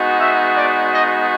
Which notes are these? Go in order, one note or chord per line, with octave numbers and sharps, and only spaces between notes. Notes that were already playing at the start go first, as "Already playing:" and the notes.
Already playing: G#3 B3 D#4 F#4
E5
D5
D#5